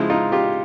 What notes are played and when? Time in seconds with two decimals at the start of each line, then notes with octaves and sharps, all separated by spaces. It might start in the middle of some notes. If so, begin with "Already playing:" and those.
Already playing: C#3 F3 G#3 E4
0.10 D#4 F4
0.32 F4 G4